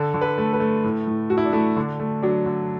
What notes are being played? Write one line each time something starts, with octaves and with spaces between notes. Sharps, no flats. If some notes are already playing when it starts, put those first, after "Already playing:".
Already playing: D3 A4
D3
B4
A3
B4
A3
A2
A2
A3 F#4
E4
D4
A3 E4
D3 D4
A3
F#3 D4
D3